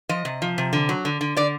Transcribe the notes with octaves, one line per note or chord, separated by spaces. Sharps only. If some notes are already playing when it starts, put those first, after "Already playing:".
F3 D#5
C3
F3
C3
D3
F#3
D3
D3
D3 D5